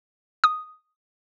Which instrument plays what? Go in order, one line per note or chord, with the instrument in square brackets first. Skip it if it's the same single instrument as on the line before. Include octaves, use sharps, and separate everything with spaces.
[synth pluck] D#6